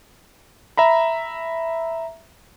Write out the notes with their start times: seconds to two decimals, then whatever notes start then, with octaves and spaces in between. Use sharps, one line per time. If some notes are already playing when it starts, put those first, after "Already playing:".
0.77 E5 A#5 B5